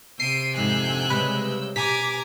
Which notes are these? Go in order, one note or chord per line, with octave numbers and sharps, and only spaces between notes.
C3 E6 G6 C7 D7 D#7
F2 G#2 D3 G#5 F#6
C#3 G3 G#3 B4
B2 G4 G#5 A#5 D6 B6